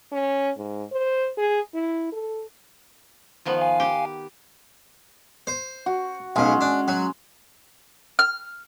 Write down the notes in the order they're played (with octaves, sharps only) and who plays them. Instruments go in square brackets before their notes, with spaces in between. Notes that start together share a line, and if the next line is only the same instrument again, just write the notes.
[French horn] C#4
G#2
C5
G#4
E4
A4
[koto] D#3 F3 B3
[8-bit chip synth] F5 G#5
[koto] G4 G5
[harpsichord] C5
[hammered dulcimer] F#4
[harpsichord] B1 C#3 [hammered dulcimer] G#3 C#4
[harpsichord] D4
F#3
[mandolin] F6